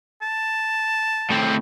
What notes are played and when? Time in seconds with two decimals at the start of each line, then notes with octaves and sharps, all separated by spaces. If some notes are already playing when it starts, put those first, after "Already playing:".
0.22 A5
1.31 A2 C4